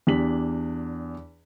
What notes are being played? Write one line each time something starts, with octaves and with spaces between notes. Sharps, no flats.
E2 D4 G4 B6 F#7